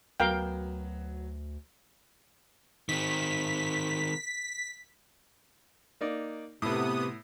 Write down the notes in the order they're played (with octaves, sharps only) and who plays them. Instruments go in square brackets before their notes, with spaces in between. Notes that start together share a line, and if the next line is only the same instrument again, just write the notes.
[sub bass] D2 [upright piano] F#3 B3 [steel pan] A#4 F5 G5
[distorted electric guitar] D#3 C4 [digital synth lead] B6
[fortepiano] A#3 D#4 D5
[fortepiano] A2 [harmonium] C3 [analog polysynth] B3 D#6